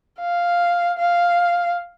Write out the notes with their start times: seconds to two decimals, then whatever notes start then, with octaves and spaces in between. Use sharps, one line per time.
0.20 F5
0.98 F5